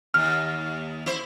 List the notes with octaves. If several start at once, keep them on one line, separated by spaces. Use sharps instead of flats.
D#2 F6
E4 C5